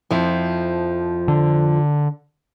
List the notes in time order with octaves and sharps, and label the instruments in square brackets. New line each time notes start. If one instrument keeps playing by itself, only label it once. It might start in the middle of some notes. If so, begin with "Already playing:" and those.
[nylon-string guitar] F2 F3 E4
[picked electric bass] D3